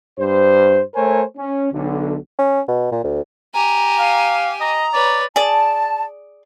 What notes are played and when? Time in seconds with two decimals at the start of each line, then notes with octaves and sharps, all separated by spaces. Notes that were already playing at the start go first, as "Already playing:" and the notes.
0.19 G2 C5
0.95 A3 A#4 C5 C#5 G#5
1.38 C#4
1.72 B1 D3
2.39 C#4
2.68 B2
2.92 A#2
3.04 D2
3.54 G4 G#5 A#5
3.99 F5
4.61 D#5 A#5
4.93 B4 C#5 D5
5.36 G#4 D5 A5